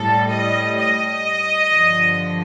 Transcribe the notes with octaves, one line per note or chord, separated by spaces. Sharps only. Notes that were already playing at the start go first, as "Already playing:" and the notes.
Already playing: A2 G3 A4
D#5
D#5
G2 D3 F3